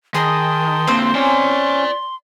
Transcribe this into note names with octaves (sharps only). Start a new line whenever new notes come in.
D#3 G#4 D#5 G5 A5 C6 D#6
D3 A#3 C4 C5
C#4 D5 G#5